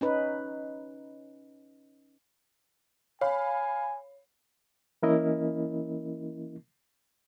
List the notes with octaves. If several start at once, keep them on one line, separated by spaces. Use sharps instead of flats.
C#4 D#4 B4
C#5 F5 G#5 B5
E3 A#3 C#4 E4 A#4 D#5